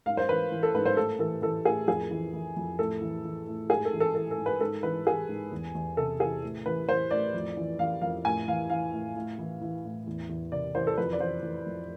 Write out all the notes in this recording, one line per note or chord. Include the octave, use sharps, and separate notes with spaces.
G#2 F5
C5
E3 B4
E3
A4
G#2 B4
C5
A2 A4
E3 A4
E3 A4
A2 G#4
F2 G#4
E3
E3
F2
A2 A4
E3
E3
A2
G#2 G#4
A4
E3
A4
E3 A4
A4
G#2
B4
G#2 A4
E3 B4
E3 G#4
G#2
E2
E2
C3 A4
E3 G#4
A2
E3 B4
E3 C5
A2 D5
F2
E3
E3 F5
F2 F5
A2 G#5
E3 F5
E3 F5
A2
A2
E3
E3
A2
E2
E2
C3 D5
E3 C5
A4
F2 B4
D5
E3 C5
E3
F2